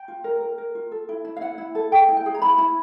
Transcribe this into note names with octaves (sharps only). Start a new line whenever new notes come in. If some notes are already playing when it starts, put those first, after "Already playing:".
Already playing: G5
F4
A#4
A#4
A#4
F4
A4
E4
E4
F5
E4 F#5
E4
A4
G#4 G5
E4
G5
G#4
A#5
E4 B5
E4